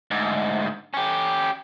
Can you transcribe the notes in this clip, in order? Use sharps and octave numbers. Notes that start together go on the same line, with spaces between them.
D2 G#2
C#4 G4